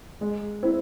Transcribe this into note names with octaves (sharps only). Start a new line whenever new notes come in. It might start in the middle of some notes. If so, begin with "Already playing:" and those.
G#3
C4 E4